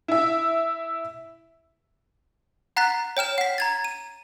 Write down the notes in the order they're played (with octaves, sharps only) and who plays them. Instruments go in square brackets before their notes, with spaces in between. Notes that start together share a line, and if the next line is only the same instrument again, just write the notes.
[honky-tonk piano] E4 E5
[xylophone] F#5 A#5 F#6 A6 B6
C#5 G5 F6 E7
F#5 B6
A#5 G#6 A6
D#7